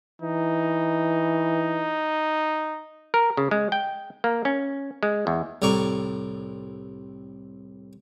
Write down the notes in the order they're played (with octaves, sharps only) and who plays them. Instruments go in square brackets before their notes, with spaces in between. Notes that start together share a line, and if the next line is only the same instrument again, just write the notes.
[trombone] E3 [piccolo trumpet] D#4
[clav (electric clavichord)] A#4
C#3
G#3
G5
A#3
C#4
G#3
E2
[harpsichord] C2 A2 D5 A#5 C#6